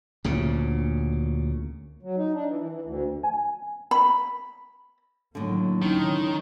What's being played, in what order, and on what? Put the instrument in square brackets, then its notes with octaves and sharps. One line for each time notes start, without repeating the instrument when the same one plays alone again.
[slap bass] D2 A#2 C#3
[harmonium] F#3
D#4
D4
E3
E3
E3
D2
[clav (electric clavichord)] G#5
[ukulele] B5
[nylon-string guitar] A2 D3 [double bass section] D#3 F#3 A#3
[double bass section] C#2 C#4 [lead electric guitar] D#3 [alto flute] D#4